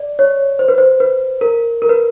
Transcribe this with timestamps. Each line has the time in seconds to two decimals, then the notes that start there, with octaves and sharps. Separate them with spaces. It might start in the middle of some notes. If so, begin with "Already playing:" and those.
Already playing: D5
0.19 C#5
0.59 C5
0.68 B4
0.78 C5
1.00 B4
1.41 A#4
1.82 A#4
1.89 B4